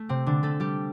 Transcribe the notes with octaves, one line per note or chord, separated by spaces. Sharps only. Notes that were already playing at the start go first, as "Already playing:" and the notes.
Already playing: A3
C3 C4
D3 D4
A3 A4
G3 G4